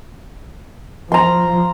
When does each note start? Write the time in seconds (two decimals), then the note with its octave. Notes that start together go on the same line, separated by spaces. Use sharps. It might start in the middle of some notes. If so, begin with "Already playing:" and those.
1.12 F3 A#5 C6